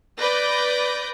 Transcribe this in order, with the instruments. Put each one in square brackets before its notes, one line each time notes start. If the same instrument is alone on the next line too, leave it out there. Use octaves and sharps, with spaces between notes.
[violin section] B4 D5 G6 A#6